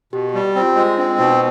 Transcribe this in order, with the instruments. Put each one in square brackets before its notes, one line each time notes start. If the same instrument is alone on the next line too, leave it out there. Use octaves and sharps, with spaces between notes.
[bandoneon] B2 [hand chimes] G4
[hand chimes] G4
[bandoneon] G3
[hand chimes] G4
[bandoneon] C4
[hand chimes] F4
[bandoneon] G#3 [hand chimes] F4
[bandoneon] C4 [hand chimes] D4
[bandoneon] B2 [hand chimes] D#4